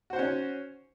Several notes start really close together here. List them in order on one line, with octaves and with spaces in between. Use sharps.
F#4 C5 F#5 C#4